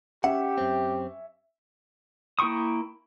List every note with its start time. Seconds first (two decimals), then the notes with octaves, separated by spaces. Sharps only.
0.24 C#4 G4 E5 F#5
0.58 F#2 C4
2.39 A#3 E4 G5 C#6 D#6